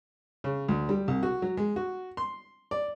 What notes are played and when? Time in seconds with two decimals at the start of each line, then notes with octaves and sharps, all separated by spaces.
0.44 C#3
0.68 D2
0.89 G3
1.08 C2
1.23 F#4
1.42 F#3
1.57 G#3
1.76 F#4
2.17 C6
2.71 D5